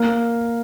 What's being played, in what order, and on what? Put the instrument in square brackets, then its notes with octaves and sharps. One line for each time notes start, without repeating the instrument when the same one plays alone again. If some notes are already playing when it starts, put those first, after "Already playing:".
Already playing: [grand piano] A#3